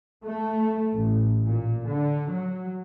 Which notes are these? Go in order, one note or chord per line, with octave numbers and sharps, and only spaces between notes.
A3
A1
A#2
D3
F#3